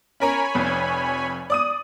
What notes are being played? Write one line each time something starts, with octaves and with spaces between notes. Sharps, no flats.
C#4 A#4 C#5 G#5 A#5 B5
F1 F2
D5 D#6 D#7